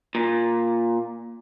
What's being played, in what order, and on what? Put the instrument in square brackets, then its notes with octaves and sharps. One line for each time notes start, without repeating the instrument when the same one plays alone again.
[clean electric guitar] A#2